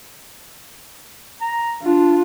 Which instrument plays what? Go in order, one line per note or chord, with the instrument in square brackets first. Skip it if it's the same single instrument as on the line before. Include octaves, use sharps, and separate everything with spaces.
[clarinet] A#5
[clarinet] D4 [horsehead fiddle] F4